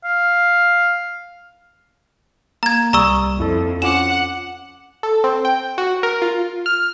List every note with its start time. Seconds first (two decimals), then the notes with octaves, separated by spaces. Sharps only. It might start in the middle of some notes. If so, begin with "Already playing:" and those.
0.04 F5
2.63 A#3 A#5 G#6
2.93 C2 G3 A#5 C#6 D#6 E6
3.40 F2 E4 A4
3.82 C#4 F4 F#5 D6 E7
5.03 A4
5.24 C4
5.45 G5
5.78 F#4
6.03 A#4
6.22 F4
6.66 F6